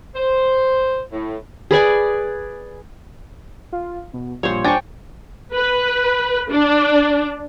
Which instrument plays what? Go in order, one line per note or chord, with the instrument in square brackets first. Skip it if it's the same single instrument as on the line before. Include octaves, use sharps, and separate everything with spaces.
[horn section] C5
A2
[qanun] G#4 B4 D5 G#5
[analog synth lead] F4
B2
[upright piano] A#1 [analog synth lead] G3 [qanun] C5 C#5
[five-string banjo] D4 [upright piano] C5 G#5 A6 [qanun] G5 C#6
[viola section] B4
D4